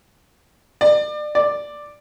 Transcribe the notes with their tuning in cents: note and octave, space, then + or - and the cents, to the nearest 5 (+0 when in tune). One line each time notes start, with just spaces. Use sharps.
D5 +30
D5 +5